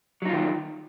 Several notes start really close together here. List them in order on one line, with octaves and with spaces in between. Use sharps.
F#3 D#4 F4 D#3